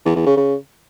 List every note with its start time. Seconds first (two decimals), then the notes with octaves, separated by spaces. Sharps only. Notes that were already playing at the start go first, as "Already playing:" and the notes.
0.05 E2
0.16 E2
0.26 C#3
0.37 C#3